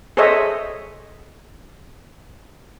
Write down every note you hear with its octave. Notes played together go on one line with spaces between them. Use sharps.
G#4 A4 C5 C#5 D#5 E5